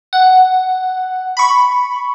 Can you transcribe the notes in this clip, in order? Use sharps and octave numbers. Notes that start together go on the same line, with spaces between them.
F#5
B5 C#6